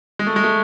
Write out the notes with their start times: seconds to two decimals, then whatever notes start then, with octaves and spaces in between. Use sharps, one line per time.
0.19 G#3
0.26 A3
0.36 G#3
0.44 A3